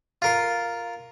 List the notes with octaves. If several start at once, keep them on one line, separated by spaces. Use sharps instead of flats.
F4 A#4 C6